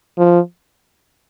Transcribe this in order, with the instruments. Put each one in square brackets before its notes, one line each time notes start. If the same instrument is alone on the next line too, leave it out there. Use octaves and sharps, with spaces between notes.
[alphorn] F3